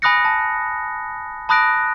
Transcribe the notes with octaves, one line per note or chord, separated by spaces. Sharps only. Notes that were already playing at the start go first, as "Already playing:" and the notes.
G#5 B5 D#6 F#6 A#6 C#7
A5
A5 B5 D#6 F#6 A#6 D7